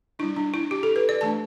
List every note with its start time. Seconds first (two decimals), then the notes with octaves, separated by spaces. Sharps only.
0.19 G3 D4 E4
0.36 D4
0.54 E4
0.71 G4
0.83 A4
0.96 B4
1.09 D5
1.21 E3 A3 D4 A5